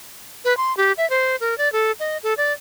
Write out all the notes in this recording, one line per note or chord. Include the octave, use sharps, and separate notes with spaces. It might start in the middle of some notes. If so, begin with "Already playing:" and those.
B4
C6
G4
E5
C5
A#4
D5
A4
D#5
A4
D5